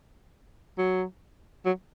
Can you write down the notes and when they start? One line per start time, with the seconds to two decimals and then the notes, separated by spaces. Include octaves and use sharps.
0.78 F#3
1.66 F#3